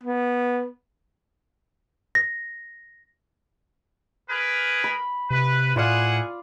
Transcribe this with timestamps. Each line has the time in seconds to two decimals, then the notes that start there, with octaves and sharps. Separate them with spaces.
0.04 B3
2.15 A#6
4.29 G#4 A#4 B4
4.84 B5
5.30 C3 B4
5.76 A2 E4 F4 G#4 D5 F5 F#5